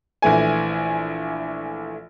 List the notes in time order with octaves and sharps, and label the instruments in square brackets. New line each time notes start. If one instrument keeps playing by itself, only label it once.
[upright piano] A#1 E3 A3 G#5